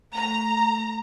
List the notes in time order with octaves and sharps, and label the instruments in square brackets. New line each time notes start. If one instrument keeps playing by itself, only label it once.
[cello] A3 [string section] A#5